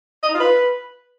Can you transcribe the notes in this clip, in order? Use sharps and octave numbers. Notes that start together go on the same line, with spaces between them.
D#5
D#4
F4
B4